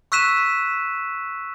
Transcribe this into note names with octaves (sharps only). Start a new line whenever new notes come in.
C#6 E6 F#6 B6 D#7 E7